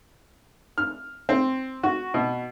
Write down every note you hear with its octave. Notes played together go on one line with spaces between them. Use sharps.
F6
C4
F#4
B2